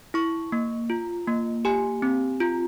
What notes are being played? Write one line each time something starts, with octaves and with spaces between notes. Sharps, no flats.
E4 C#6
A#3
F4
A#3
G4 G#5
C4
F4